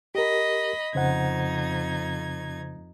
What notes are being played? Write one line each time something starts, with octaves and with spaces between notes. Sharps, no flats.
G4 A#4 D#5 B5
F2 C#3 D#4 C5 F#5 G#6